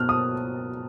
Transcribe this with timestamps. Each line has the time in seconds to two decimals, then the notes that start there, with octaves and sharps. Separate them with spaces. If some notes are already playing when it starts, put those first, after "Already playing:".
Already playing: B2 F6 F#6
0.09 D#6